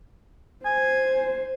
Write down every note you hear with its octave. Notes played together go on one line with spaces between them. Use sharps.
C5 G#5